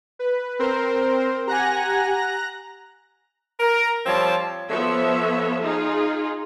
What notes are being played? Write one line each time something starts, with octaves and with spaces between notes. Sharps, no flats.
B4
C4 A#4 C5
G4 F#5 G#5 A#5 F#6 A#6
A#4
F3 G3 C4 C#5 A5
F3 B3 A4 C#5 E5
D#4 F4 G#4